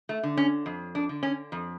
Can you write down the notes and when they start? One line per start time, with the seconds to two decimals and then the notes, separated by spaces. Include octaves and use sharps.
0.09 A3
0.23 D3
0.37 C#4
0.66 F2
0.95 D4
1.09 D3
1.23 C#4
1.52 F2